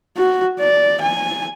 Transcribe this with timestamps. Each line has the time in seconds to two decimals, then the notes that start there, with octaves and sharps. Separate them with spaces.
0.17 F#4
0.60 D5
1.01 G#5